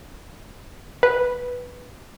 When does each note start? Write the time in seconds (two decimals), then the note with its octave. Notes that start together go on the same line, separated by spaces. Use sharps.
1.03 B4